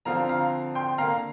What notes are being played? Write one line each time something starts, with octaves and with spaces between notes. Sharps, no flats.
D3 F3 C4 F5 A#5
F5 A#5
G5 C6
D3 A#3 F5 A#5